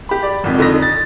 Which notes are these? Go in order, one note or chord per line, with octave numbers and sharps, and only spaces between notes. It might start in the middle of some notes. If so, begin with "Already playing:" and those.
G4 B5
D5
G#1 F2 C3
F2 D3 D#4 A#6
A6